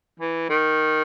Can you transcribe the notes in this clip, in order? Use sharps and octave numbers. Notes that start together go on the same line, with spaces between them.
E3
D#3